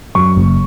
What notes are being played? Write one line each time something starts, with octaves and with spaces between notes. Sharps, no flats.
F#2 C#6
F#1